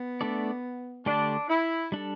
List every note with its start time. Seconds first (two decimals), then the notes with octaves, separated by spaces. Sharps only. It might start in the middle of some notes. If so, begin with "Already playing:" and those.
Already playing: B3
0.21 A3 D4 A4 D5
1.06 D3 A3 D4 G4 D5
1.49 E4
1.92 G3 D4 A4